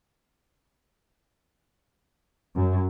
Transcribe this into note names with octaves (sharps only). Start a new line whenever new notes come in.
F#2